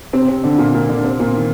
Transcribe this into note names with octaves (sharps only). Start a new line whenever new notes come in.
C3 C4
C3 C4
D3 D4
A#2 A#3
A#2 A#3
D3 D4
C3 C4
A#2 A#3
D#3